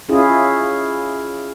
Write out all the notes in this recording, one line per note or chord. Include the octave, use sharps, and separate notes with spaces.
C#4 E4 F4 G#4